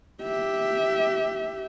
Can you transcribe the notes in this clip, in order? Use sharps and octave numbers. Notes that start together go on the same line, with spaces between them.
G4 E5